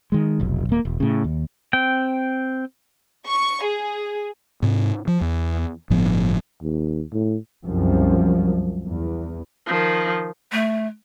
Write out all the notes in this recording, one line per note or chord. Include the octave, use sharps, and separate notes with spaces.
D#3 G#3
F1 B1
D#1 A#3
E1
A2 C#3
D#2
C4 G5
C#6
G#4
G#2 C3 C4
F3
E2
G1 A2 F3 B3
D#2
A2
C2 F#2 F3
E2
D#3 F3
A3